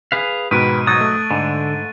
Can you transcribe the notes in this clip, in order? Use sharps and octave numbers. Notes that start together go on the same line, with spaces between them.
G#4 B4 F5
G#2 B2 D#3 B4 F#6 D7 D#7
F#3 D#4 D#6 A6 D#7
A3
G#2 D3